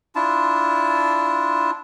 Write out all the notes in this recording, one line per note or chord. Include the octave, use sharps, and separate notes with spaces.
D4 E4 F4 A5